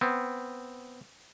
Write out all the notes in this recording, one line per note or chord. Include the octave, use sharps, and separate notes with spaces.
B3 C4